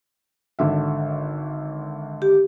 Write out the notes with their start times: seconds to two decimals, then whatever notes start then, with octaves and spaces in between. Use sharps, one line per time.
0.59 G#1 D3 E5
2.22 G4